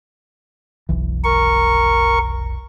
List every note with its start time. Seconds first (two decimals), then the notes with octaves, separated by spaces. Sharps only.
0.89 F1 B1 E3
1.24 A#4 C#6